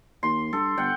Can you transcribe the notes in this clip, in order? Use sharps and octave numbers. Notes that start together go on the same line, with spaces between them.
D#2 C6
G2 A4
G1 F#5 G5